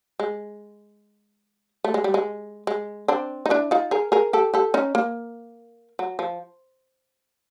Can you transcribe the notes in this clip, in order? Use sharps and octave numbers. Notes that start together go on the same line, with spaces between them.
G#3
A3
G#3
G3
G#3
G#3
C4 D4
D#4
D4 E4
D#4 F4
G#4 A#4
G#4 A#4
G4 A4
G4 A4
C#4 D#4
A#3
F#3
F3